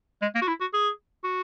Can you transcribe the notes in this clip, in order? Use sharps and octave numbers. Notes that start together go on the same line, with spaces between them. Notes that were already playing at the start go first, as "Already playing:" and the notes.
G#3
A#3
F#4
E4
F#4
G#4
F#4